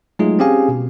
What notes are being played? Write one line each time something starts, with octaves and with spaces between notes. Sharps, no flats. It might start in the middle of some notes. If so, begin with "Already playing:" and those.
F#3 G#3 A3 D#4 F4 G#4
C4 C#4 G4 G#4 F5 G#5
B2